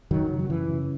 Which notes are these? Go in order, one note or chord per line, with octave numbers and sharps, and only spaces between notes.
F#2 D#3 F#3
C#3
F#3
F#2 E3
C#3